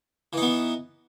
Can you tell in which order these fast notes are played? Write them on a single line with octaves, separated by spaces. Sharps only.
E3 D#4 B3